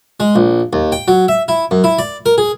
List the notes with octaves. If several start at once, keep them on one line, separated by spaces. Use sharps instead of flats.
G#3
A#1
D#2
G5
F#3
E5
E4
F#2
E4
D5
A#4
G#4